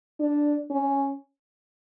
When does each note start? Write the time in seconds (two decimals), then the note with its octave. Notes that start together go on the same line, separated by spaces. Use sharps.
0.20 D4
0.70 C#4